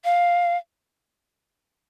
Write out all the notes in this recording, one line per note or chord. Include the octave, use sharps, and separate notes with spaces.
F5